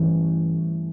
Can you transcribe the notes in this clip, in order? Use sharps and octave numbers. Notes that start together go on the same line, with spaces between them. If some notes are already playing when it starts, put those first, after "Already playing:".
Already playing: G2 E3 A3 C#4